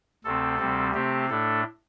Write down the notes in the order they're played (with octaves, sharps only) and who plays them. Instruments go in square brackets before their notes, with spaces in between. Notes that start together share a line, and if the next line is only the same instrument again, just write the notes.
[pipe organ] D2 C3 A3 C4 A4
D2 C3 G3 C4
C3 A3 C4 G4
A2 A3 D4 A4